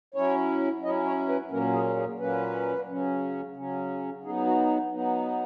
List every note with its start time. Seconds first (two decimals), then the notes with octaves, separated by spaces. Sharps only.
0.14 F#3 C#4 E4 C#5
0.83 F#3 C#4 E4 D#5
1.05 C#5
1.29 B4
1.51 A#2 F#3 A#3 C#4 A#4
1.74 G#4
1.97 G#4
2.19 A#2 F#3 A#3 C#4 B4
2.87 C#3 F#3 C#4
3.56 C#3 F#3 C#4
4.23 F#3 B3 D#4 G#4
4.47 F#4
4.92 F#3 B3 D#4